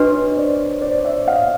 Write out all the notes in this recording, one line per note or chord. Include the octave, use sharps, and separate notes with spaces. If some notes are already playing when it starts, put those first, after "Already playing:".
Already playing: D4 F#4 B4 C#5 D#5
C5 D5
C5 D5
D5 E5
D#5 F5